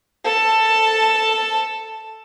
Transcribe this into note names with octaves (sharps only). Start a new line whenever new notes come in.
A4 A5